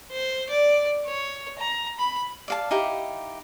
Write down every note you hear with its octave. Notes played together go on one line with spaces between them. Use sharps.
C5
D5
C#5
A#5
B5
D5 F5 A5
D#4 E4 G4 F5